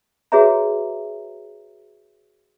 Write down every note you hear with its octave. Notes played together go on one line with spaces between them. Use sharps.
F#4 G#4 B4 C#5 E5 A#5